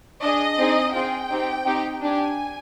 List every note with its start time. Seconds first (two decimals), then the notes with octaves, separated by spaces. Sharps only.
0.22 D4 G#4 D#5
0.57 C4 D#4 G#4
0.93 C4 F4 G#4 G5
1.30 C4 D#4 G4
1.65 C4 D#4 G4
2.02 D4 G4 G#5